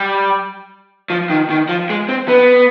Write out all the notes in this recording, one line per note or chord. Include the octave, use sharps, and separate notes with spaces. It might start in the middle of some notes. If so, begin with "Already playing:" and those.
Already playing: G3
F3
D#3
D#3
F3
G#3
C4
B3